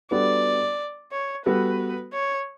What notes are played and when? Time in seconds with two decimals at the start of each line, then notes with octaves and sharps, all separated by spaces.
0.11 G3 B3 D4 F#4 A4 D5
1.12 C#5
1.45 G3 B3 F#4 A4 B4
2.13 C#5